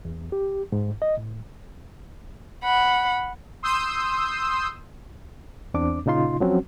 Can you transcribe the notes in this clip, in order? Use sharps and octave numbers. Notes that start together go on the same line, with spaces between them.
E2
G4
G#2
D#5
A2
F#5 B5
C6 D#6 E6 G6
E2 C4 D4 D6
A#2 C#3 D#4 F4 C6
F3 F#3 C4 C#4 F#4